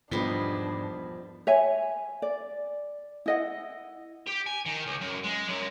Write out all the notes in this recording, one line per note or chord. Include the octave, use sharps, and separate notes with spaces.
E1 G#2 F3 G3 B3 D4 D#4 G7
C#5 E5 G#5
D5
E4 D#5 F#5
G4
G#5
D#3
C#2
F#2
G#3
F#2